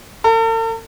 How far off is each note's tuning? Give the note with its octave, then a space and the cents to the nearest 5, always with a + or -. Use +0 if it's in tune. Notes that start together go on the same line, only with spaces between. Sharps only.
A4 +45